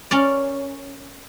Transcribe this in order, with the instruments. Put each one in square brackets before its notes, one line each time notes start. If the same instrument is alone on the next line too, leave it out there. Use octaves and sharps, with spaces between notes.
[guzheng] C#4 A#4 D5